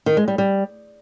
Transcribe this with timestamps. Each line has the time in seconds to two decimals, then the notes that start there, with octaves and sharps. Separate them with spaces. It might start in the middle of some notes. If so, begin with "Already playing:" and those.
0.06 D#3
0.17 G#3
0.28 G3
0.38 G3